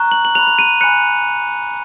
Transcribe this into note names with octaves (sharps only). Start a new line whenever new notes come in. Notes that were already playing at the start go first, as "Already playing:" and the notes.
Already playing: A#5 C#6 F#6
F#7
F#7
B5 F#6 F7
F7
D#7
G#5 B5 F#6 C#7